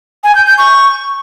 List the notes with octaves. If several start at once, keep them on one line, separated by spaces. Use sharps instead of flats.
G#5
G6
G6
C#6